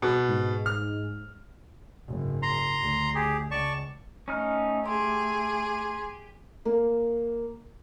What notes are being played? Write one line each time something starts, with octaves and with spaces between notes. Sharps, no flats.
B2
G#2
F6
F#1 G#2
A#5 C6
D2
G4 G#4
C#2 D5 A5 C#6
A3 C#4 D#4 F6
G4 G#4 C6
A#3